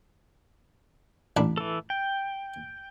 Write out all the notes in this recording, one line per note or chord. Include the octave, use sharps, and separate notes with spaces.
A1 D4 B5
E3 A4
G5